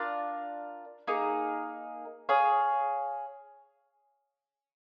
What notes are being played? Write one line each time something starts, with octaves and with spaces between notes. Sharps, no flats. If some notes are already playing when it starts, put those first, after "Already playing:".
Already playing: D4 F4 A#4 D5
A#3 D#4 G#4
G#4 C#5 F5